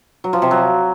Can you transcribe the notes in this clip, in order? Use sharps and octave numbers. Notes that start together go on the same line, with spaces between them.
F#3
F3
C3
F#3